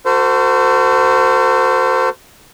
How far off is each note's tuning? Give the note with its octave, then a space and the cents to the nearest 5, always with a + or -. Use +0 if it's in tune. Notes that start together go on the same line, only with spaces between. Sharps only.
F#4 +0 A4 +40 C5 -25